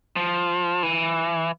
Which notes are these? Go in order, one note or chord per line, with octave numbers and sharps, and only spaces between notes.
F3
E3